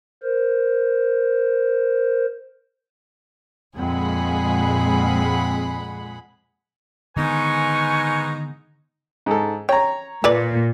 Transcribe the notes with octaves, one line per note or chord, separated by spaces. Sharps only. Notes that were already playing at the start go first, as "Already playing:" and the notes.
A#4 C5
F2 A#2 G#3 C4 G#4 F#5 B5
G#2 D3 D#3 B3 D#4 B4 G#5 C#6
G#2 A4
C#5 G5 A#5
A#2 A4 B4 D5